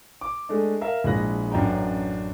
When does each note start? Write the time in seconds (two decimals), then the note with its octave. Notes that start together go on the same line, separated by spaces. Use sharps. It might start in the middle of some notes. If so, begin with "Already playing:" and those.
0.21 D6
0.49 G#3 A3 D4
0.81 A#4 E5 F5
1.04 A#1 G#3 E4 F#6 A#6
1.51 A1 F#2 D4 D#5 G5 A#5